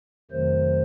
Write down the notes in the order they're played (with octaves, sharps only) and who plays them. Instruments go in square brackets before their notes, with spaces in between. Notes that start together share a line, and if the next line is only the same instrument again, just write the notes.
[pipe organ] F2 C3 D#3 F#3 A3 C5